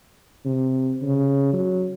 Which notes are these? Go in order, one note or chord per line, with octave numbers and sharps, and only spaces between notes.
C3
C#3
F#3